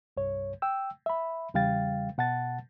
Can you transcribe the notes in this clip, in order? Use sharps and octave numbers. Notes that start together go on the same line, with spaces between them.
C2 G2 C#5
G5 E6
E5 B5
E2 C#3 G3 F5 G5 A6
B2 F#5 A5 A6